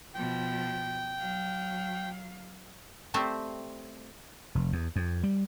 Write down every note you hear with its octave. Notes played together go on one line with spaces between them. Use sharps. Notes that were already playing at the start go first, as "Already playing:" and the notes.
B2 F3 G5
F#3 F5
G3 A3 C4 C5 E5
F1
E2
F2
G3